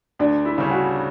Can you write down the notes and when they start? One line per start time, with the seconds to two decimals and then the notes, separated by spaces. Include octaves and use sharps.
0.19 D2 D4
0.45 E4
0.58 C#3 G3 C#4
0.71 F#4